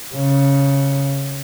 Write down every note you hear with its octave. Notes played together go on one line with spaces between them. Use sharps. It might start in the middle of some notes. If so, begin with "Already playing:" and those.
C#3